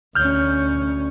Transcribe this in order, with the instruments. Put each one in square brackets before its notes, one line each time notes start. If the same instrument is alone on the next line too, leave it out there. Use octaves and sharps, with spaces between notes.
[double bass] D2 C#4 [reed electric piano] F6 G6